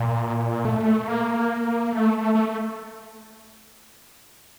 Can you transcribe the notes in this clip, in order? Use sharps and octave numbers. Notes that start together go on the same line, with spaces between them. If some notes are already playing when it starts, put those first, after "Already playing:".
Already playing: A#2
A3
A#3
A3
A3